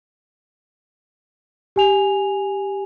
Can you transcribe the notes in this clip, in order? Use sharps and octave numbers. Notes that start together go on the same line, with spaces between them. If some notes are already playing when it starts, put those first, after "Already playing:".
G4 G#5 F7